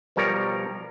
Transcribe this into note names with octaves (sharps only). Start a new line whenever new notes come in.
B2 F3 G3 A#4 C#5 A#5